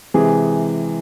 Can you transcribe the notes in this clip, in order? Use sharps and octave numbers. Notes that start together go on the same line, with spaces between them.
C3 E3 G#3 G#4